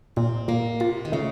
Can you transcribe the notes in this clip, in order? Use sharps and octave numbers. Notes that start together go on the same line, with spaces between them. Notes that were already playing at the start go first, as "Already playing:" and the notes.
A#2 C4
A#2 A#3
C3 F4
D#3
C#3 A3